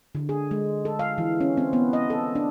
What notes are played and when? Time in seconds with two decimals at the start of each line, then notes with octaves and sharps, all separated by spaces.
0.15 D3
0.29 G#4
0.51 G#3
0.85 A4
0.99 F5
1.18 E3
1.40 C#4
1.57 C4
1.73 B3
1.93 D#5
2.10 A4
2.35 D4